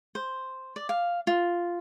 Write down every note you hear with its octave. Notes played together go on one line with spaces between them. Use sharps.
C5
D5
F5
F4